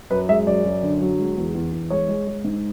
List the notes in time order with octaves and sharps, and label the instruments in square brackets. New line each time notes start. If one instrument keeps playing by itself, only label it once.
[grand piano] F#2 B4
G#3 E5
F#2 D5
F#2
D3
F#3
G#3
E2
E2
E2
G#3 C#5
G#3
G#3
G#2